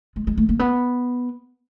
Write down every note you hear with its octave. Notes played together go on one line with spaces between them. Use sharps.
G#3
G#3
A3
A#3
B3